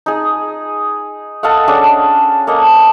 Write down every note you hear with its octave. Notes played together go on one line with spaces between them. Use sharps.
D#4 G#4
A4 D#5 F5 F#5
C#4 D4 G#4
A#3 A4 D#5